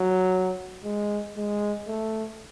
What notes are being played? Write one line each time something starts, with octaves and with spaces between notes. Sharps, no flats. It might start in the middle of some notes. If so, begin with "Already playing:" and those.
Already playing: F#3
G#3
G#3
A3